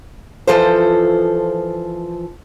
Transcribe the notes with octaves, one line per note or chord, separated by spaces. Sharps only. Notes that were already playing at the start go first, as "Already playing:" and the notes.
E3 F3 F4 A4 C5